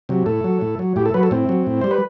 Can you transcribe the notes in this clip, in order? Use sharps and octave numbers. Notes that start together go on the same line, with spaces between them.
C3 F#3
A2 A4
F#3
A2
F#3
A2 G4
A4
F#3 B4
A4
A2 C4
F#3
A2
G3 C5
B4